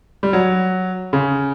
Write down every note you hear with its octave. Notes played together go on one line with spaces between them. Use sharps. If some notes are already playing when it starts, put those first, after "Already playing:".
G3
F#3
C#3